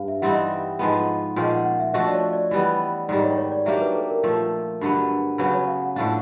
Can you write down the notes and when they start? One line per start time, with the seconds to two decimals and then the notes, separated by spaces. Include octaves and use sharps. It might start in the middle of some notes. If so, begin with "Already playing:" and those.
Already playing: G2 F5
0.08 E5
0.22 E3 G3 C4 D#4 F#5
0.79 G#2 F3 G#3 B3
1.36 A#2 F3 G#3 C#4 G5
1.51 F#5
1.65 F#5
1.80 E5
1.94 F3 A3 D4 F#4 D#5
2.07 D5
2.13 C#5
2.33 D5
2.51 E3 G3 B3
3.08 G#2 D#3 G3 D5
3.23 C#5
3.37 C#5
3.52 D5
3.66 F#3 A#3 D4 G4 E5
3.81 B4
3.96 A4
4.10 A#4
4.24 A#2 F3 A3
4.81 G2 D3 F#3 B3
5.38 C#3 F#3 B3 B4
5.54 C#5
5.67 F5
5.82 F#5
5.96 A2 F3 A3 D4 F5